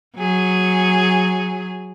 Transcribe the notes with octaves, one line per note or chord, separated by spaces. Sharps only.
F#3 G#4